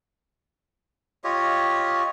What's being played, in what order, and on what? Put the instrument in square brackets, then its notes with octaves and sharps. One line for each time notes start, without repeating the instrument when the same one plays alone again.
[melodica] F4 G4 C#5 D#5